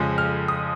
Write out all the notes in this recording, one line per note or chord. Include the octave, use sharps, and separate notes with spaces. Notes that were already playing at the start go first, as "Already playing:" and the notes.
Already playing: F2 C#3 F3 G#3 G#5
F6
D#6